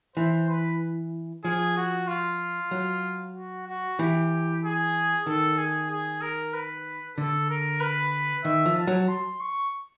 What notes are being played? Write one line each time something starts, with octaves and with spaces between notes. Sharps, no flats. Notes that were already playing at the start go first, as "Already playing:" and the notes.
E3 C5
B4
F3 G#4
F#4
F4
F#3
F#4
F#4
E3 G4
G#4
D#3 A4
G#4
G#4
A#4
B4
D3 A4
A#4
B4
D#3 E5
F3
A5
F#3
C6
C#6